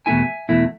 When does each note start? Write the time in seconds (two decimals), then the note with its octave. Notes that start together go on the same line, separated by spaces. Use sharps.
0.06 E2 B2 A3 E4 E5 G#5
0.49 E2 B2 A3 E4